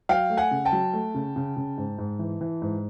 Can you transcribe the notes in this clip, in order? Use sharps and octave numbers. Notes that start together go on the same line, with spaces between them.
F#3 F5 G5
A3
F#5 G#5
C#3
G5 A5
F#3
A3
C#3
C#3
C#3
G#2
G#2
E3
E3
G#2